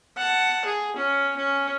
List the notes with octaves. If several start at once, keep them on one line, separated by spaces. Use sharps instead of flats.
F#5 A5
G#4
C#4
C#4